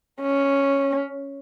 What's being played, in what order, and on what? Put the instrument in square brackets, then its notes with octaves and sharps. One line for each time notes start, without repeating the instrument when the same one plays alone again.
[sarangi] C#4